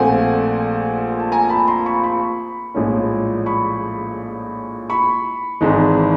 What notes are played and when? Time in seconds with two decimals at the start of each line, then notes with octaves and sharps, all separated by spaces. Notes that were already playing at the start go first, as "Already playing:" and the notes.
Already playing: A#1 A#2 F3 A3 C4 F#5 G#5
1.20 A5
1.32 G#5 A#5
1.49 A5 B5
1.68 A#5 C6
1.86 B5 C#6
2.03 B5 C#6
2.74 A#1 A2 F3 G#3 C#4
3.46 B5 C#6
4.90 B5 C#6
5.61 G#1 G#2 E3 G#3